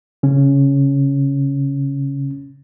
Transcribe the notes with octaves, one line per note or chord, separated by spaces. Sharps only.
C#3 C#4